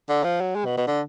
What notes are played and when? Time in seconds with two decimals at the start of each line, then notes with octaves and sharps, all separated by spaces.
0.09 D3
0.24 F3
0.41 F#3
0.55 G#3
0.66 B2
0.77 B2
0.87 D3